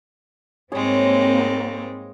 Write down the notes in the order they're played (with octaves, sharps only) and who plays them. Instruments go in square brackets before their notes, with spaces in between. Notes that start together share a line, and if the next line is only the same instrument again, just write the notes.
[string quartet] G#2 G3 G#3 [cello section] A#3 C4 [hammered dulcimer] G#4 C#5